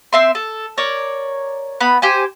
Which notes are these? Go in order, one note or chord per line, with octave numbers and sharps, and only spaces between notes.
C4 E5 C6
A4
A#4 C#5 D5
B3 B5
G4 C5 G#5